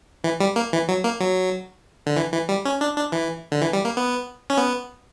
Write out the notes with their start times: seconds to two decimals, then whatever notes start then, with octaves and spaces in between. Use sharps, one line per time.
0.24 E3
0.40 G3
0.56 A#3
0.73 E3
0.88 F#3
1.04 A#3
1.20 F#3
2.06 D3
2.17 E3
2.33 E3
2.49 G3
2.65 C#4
2.81 D4
2.96 D4
3.12 E3
3.52 D3
3.61 E3
3.73 G3
3.85 A#3
3.97 B3
4.50 C#4
4.57 B3